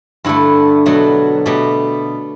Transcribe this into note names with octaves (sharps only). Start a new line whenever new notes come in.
G2 D3 A3 E4
B2 F#3 A3
B2 A3 G4